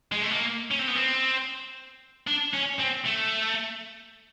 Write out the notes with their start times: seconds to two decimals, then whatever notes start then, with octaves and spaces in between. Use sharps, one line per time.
0.12 G#3
0.22 A3
0.31 A#3
0.71 C#4
0.79 C4
0.88 B3
0.95 C4
2.27 D4
2.54 C#4
2.79 C4
3.05 A3